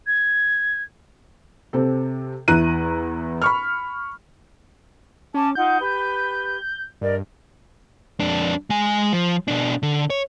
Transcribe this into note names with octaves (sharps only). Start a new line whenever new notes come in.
G#6
C3 C4 A4
E2 E4 A#5 F#6 D#7
B5 C#6 F6
C#4 A5 D6
D#4 F4 F#5 G6
G4 B4
G2 A#4 D5 D#5
F2 D4
G#3 G#5
F3
B2 D4
D3
C#5